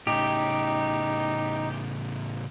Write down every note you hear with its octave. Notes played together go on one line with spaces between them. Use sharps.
A2 C#3 D#4 G4